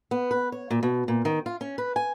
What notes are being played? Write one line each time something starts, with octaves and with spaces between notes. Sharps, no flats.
B3
B4
C#5
A#2
B2
A#2
D#3
F4
C#4
B4
G#5